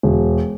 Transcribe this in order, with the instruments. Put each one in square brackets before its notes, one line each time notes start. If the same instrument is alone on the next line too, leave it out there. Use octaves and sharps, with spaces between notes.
[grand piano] E1